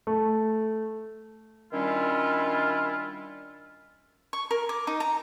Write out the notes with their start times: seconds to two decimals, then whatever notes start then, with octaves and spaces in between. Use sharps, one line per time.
0.07 A3
1.73 D#3 G3 C#4 D4 E4 F4
4.33 C#6
4.51 A#4
4.69 D6
4.87 D#4
5.00 A#5